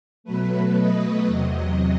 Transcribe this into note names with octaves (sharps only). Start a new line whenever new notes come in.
B2 F#3 A3 B4
D#5
E2 C3 F#3 D#5